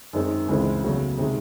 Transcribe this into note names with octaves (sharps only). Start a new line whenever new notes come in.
F#2 D#3 G#3 C4 D#4
C#2 C#3 E3 G#3 C4
E2 C#3 F#3 A3
C3 D#3 G#3